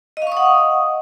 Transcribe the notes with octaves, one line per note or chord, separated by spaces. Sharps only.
D#5 F5 F#5 C#6 D#6